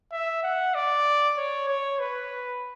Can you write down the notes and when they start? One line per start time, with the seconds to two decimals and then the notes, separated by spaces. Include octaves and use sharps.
0.12 E5
0.43 F#5
0.75 D5
1.37 C#5
1.68 C#5
2.00 B4